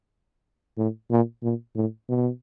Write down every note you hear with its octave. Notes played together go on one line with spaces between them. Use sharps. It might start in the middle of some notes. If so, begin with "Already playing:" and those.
A2
A#2
A#2
A2
B2